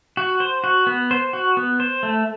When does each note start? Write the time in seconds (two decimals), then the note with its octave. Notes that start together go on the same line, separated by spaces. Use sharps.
0.17 F#4
0.40 C5
0.64 F#4
0.87 B3
1.11 C5
1.33 F#4
1.57 B3
1.80 C5
2.03 A3